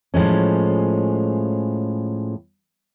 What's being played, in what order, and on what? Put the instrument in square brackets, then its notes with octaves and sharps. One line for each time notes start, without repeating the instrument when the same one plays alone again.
[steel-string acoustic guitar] A2 F3 G#3 C#4